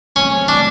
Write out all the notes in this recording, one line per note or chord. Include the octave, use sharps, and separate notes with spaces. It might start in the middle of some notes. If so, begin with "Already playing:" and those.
C#3 F#3 A3 C4 C#4
D4